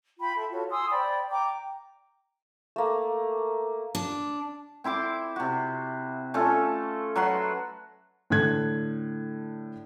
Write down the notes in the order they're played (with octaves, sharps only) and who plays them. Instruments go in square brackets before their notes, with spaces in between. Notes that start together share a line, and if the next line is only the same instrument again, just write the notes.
[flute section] F4 G5 B5
A4 E5
F4 F#4 A4 C#5
G#5 C6 D#6 E6
C5 D5 G5 B5
G5 A#5 D6
[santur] A3 A#3
[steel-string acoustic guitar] D4
[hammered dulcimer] C4 E4 C6 D6
C3 F#4
A3 C#4 F4 A4
F#3 B4 F#5 C6
[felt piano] A2 D3 F#6 G#6